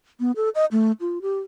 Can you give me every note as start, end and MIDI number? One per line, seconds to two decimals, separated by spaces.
0.20 0.32 59
0.36 0.49 69
0.55 0.65 75
0.72 0.92 57
1.01 1.22 65
1.22 1.39 67